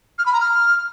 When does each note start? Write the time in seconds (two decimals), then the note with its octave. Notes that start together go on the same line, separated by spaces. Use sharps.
0.18 F6
0.25 B5
0.33 A#5
0.40 F6